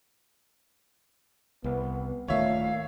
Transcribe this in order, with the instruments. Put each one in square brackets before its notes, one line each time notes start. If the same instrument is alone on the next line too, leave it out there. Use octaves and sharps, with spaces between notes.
[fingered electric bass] C2 [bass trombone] B3
[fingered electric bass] D1 D#3 A3 [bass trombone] A#2 [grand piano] C#5 E5 [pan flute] F5